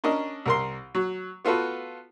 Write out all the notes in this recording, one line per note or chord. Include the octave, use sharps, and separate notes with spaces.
C#4 D4 A#4 D#5
C2 A#4 C6
F#3
B3 F4 F#4 A4 B4